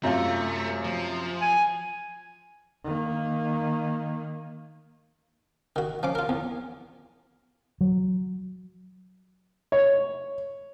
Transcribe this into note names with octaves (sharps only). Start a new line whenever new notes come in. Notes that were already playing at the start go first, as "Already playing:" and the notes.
F#2 C3 A3 F4
F3
G#5
D#3 A#3
D#3 F#4
F3 C#4 D6
F4 A#4
E2
F#3
C#5